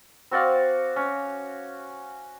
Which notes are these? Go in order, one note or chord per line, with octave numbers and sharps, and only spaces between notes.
C4 F#4 D5 F5
C#4